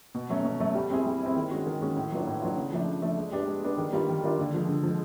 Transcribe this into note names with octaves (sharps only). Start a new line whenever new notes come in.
B2
F#3 A3 C#4
B2
F#3 A3 C#4
G3
C4 E4 G#4
G3
C4 E4 G#4
D#3
G#3 C#4 F#4
D#3
G#3 C#4 F#4
A2
F#3 B3 D4 F4
A2
F#3 B3 D4 F4
C#3
F3 A3 D4
C#3
F3 A3 D4
G#3
B3 D4 G4
G#3
B3 D4 G4
D#3
G3 A#3 D4 F4
D#3
G3 A#3 D4 F4
D3
F3 G#3
D3
F3 G#3